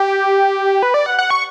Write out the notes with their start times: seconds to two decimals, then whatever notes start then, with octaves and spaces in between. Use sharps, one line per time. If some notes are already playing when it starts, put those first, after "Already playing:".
Already playing: G4
0.83 B4
0.94 D5
1.06 F#5
1.19 F#5
1.30 C#6